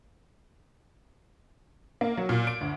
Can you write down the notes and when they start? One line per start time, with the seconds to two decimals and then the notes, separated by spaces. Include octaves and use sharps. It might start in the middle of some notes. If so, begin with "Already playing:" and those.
2.01 A#3
2.17 F#3
2.29 A#2
2.47 D7
2.61 D2